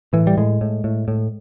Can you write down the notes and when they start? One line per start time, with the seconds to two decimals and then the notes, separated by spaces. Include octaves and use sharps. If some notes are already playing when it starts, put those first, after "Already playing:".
0.13 A2 E3
0.27 G3
0.37 A2 G#3
0.61 A2
0.84 A2
1.08 A2